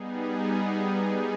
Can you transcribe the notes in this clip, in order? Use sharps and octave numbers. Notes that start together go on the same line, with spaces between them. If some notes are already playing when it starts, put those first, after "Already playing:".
Already playing: G3 B3 D#4 G#4